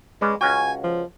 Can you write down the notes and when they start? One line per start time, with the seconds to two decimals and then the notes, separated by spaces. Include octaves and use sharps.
0.21 G#3 C#4 B4 D5
0.41 C#2 C#4 F#4 G#5
0.84 F3